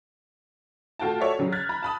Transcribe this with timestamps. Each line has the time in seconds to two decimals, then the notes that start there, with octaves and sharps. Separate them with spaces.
0.99 A3 F4 F#4 G5 A5
1.21 F#4 A4 C#5 D5 E5
1.39 C#3 F#3
1.52 F6 F#6 G#6 A6 B6
1.69 A#5 B5 F6
1.82 A5 B5 D#6